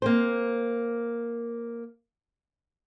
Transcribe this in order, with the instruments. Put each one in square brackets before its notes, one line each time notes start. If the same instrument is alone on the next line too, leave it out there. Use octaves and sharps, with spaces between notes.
[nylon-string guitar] A#3 C4 C5